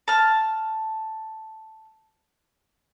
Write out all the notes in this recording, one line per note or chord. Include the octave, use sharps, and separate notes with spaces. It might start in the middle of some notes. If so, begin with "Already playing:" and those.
A5 F6